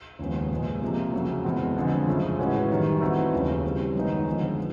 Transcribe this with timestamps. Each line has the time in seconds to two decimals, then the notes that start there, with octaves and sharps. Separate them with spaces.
0.19 D#2 C#3 F3 G#3 B3
0.51 A#2 F3 G#3
0.82 C3 F3 A#3
1.13 F2 C#3 F#3 A3
1.44 E2 B2 G#3 C4
1.76 F2 D3 F3 G#3 C4
2.07 F#2 C#3 F3 A3
2.39 A2 E3 G#3 C#4 F#4
2.70 F#2 D#3 G3
3.01 E3 A3 C4 D#4 F#4
3.32 D#2 C#3 F3
3.64 C#3 E3 G3 C4
3.95 F#2 D#3 G#3 B3 D#4
4.27 F2 D3 F3 G#3 B3
4.58 F3